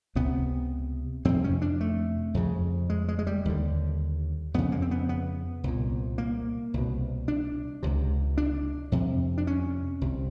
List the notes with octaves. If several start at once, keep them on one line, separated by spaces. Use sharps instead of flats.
C#2 C3 B3
F2 C3 C4
C#4
D4
A3
F2 C#3
G#3
G#3
G#3
G3
D#2 D3
F2 C#3 B3
A#3
C4
B3
B3
C2 A#2
A#3
C2 B2
D4
C#2 C3
D4
F2 C3
D4
C#4
C2 C3